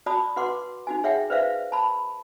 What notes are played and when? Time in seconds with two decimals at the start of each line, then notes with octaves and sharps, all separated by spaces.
0.06 F#4 D5 A5 B5 D#6
0.36 F#4 B4 F#5 C6 D6
0.87 D#4 F#4 G#5
1.04 G#4 C#5 E5 F#5 G5
1.30 B4 C5 D5 E5 F5
1.72 A5 B5